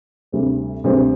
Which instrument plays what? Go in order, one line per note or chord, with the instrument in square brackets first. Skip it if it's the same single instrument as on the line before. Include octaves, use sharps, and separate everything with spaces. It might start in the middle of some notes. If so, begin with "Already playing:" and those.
[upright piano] D2 C3 G3 C4
D2 C3 G3 C4